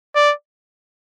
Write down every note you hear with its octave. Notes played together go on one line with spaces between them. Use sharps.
D5